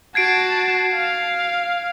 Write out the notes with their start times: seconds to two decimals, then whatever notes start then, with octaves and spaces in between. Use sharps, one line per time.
0.15 F#4 A5 G#6 C7 D7
0.95 F5